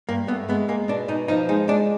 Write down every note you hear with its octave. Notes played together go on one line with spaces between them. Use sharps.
G2 A#3
A3 B3
G#3 B3
G#3 A#3
B2 D4
B2 D#4
F3 D#4
G#3 D#4
G#3 D4